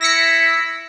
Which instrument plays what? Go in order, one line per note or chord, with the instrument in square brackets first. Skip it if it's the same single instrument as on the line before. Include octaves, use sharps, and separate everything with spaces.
[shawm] E4 [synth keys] A#6 B6 C#7